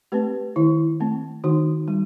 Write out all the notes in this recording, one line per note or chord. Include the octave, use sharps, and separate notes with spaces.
A3 C4 G4 B4
D#3 E4
A3 C4
D#3 D#4 F#4
G3